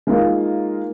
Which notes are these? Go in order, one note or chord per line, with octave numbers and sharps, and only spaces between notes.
G#3 A#3 D#4 F4